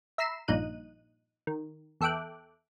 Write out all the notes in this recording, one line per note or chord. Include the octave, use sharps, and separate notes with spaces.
E5 A#5 B5 E6 C7 E7
A#1 G2 A#2 D#4 F#6 D#7
D#3
E2 A4 E5 G5 D6 F#6